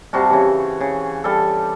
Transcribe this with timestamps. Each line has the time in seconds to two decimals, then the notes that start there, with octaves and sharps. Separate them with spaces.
0.13 C3 G3 F#4 A5
0.30 C#3 E3
0.81 C#3
1.24 G3 A4